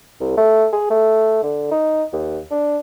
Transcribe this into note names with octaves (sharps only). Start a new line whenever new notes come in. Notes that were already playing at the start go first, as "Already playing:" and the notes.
C2
A3
G#4
A3
D3
D#4
D#2
D4